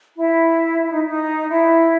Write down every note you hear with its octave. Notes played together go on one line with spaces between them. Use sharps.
E4
E4
D#4
D#4
E4